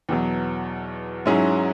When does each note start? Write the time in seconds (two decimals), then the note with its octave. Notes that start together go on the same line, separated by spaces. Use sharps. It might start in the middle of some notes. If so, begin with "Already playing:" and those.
0.09 E2 B2 F#3
1.26 G#2 F#3 C#4 E4 G#4